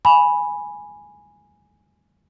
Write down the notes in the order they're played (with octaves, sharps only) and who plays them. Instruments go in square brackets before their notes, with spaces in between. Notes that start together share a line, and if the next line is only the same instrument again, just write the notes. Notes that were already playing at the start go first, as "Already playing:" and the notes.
[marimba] G#5 B5